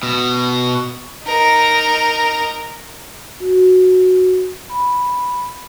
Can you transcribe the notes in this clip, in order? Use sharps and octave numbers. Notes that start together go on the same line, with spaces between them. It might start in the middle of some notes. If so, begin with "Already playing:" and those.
B2
D#4 A#4
F#4
B5